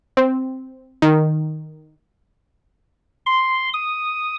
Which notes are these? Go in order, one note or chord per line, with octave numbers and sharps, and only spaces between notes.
C4
D#3
C6
D#6